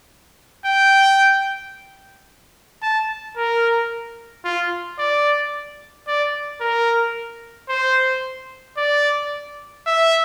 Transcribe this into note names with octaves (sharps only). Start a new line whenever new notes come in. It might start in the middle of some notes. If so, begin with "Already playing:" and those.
G5
A5
A#4
F4
D5
D5
A#4
C5
D5
E5